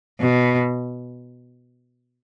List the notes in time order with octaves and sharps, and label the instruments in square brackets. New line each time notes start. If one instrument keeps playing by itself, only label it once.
[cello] B2